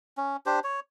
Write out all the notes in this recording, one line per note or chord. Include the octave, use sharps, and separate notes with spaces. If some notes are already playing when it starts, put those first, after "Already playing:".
C#4
D4 G4 C5
C#5